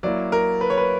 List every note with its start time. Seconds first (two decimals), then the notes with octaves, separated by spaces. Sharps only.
0.03 F#3 A#3 E4 D5
0.32 A#4
0.61 B4
0.70 C#5
0.78 B4